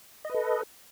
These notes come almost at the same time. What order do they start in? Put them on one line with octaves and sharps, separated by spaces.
D#5 B4 A4